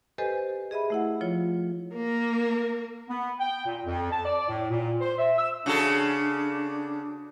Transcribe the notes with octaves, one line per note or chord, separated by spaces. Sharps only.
G4 A4 B4 C5 D#5 G#5
G#4 D#5 E5 B5
A3 E4 F#5
F3 F4 C#5
A#3 A#4
B3
G5
A#2
F2
A5
D5
A2
A#2
C5
E5
E6
C#3 D4 F#4 A4